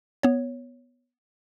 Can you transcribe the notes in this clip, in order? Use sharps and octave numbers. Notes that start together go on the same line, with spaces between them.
B3 C#5